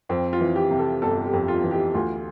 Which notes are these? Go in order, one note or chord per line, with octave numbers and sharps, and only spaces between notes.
F2 C4
F4
E3
G4
C3
A4
G1 A4
G4
F2
F4
E3
G4
D2 F4